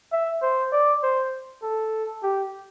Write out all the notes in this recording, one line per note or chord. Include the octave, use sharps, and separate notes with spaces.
E5
C5
D5
C5
A4
G4